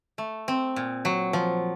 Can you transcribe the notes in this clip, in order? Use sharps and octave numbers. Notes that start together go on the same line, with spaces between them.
A3
C4
A#2
F#3
F3